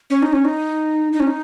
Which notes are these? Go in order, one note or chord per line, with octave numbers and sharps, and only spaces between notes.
C#4
D#4
C#4
D#4
D#4
C#4
D#4